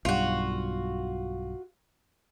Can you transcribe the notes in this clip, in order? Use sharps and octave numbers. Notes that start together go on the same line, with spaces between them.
B1 G2 G3 F4 F#4